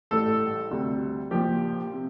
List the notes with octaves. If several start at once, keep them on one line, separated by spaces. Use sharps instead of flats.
A1 A2 G3 A4
D2 C3 G3
A#1 A#2 F3 G4
C3